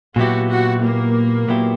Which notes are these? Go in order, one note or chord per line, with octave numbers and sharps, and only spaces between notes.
A#2 F#3 B3 E4 F#4 G4
F#4
A#3
A#2 F#3 B3 E4 G4